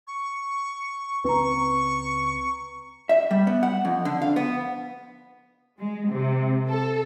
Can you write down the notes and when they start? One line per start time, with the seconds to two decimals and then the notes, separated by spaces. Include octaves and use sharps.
0.07 C#6
1.24 C#2 C4 B4 A#5 C#6
3.09 E5
3.31 G3
3.47 B3
3.63 F#5
3.85 F2
4.05 D3
4.22 F5
4.36 B3
5.79 G#3
6.09 C3
6.68 A4